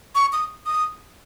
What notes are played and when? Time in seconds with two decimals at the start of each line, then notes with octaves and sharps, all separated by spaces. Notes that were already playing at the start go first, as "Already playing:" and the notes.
0.15 C#6
0.33 D#6
0.66 D#6